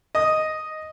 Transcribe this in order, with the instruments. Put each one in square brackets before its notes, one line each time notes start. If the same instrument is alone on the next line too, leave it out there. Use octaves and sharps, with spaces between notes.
[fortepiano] D#5 D#6